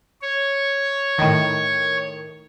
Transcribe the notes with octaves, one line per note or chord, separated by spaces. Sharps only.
C#5
A2 D#3